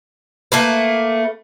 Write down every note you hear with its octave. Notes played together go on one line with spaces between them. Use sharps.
A3 A#3 B4